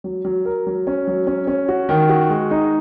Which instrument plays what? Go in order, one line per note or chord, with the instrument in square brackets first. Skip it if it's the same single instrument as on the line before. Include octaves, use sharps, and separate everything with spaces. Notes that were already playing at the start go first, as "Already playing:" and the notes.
[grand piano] F#3
F#3
A#4
F#3
C#4
F#3
C#4
C#4
F#4
D#3
F#4
G#3
D#4